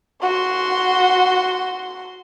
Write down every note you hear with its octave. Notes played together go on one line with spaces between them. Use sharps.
F#4 C6